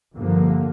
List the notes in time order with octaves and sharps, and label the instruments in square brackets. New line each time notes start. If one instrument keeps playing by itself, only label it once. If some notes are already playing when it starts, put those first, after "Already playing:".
[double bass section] G2 D3 F3 A#3